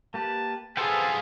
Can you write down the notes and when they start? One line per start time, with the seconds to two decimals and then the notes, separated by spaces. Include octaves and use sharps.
0.14 A#3 G4 B4 A5
0.77 B3 F4 G#4 A4 B4 C5 G5